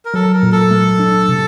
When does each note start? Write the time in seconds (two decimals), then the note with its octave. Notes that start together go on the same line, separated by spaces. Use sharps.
0.05 A#4
0.14 F#3 A4
0.33 A#4
0.43 A#2
0.52 A4
0.71 A3
1.00 D4
1.29 C3